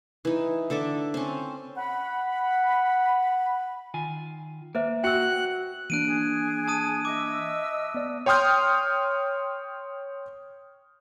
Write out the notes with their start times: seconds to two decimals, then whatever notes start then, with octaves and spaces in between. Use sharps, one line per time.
0.25 E3 D#4
0.70 D3 A4 D5 E5
1.14 C4 C#4
1.78 F#5 B5
3.94 D#3 F4 G#5
4.75 A#3 B4 C5 E5
5.03 F#4 G5 C6 E6 F#6 C#7
5.90 E3 A#3 D4 F#6 D7 D#7
6.06 G#4
6.68 A5 D#6 D#7
7.05 D#5 E5 D6 E6
7.95 B3 D5
8.26 C#5 G5 C6 D#6 F6 G6